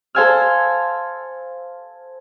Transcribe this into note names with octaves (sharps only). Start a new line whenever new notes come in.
A4 C5 F5 G#5 E6 F6